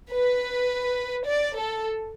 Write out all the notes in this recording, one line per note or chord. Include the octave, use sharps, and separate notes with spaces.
B4
D5
A4